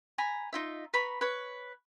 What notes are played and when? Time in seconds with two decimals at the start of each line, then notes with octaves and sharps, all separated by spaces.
0.18 G#5 A#5 B5
0.53 D#4 F4 E5
0.94 B4 A#5 B5 C#6
1.21 B4 C#5